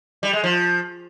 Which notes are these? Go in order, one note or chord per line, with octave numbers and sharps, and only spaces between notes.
G3
G#3
F3